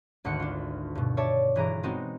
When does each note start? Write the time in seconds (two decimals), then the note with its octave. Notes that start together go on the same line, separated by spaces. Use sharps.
0.25 G#1 D2 F#5 C#7
0.40 D4 F4
0.95 G2 B2
1.17 C#5 D5 E5 A5
1.56 G1 E3 G#4 A#5 D7
1.83 G#3 B3 C4 D#4 F#4